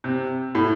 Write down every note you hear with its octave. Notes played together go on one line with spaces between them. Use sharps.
C3
A2